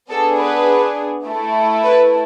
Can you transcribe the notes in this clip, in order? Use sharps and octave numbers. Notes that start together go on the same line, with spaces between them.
B3 D4 G#4 A4
B4
A3 E4 A4
B4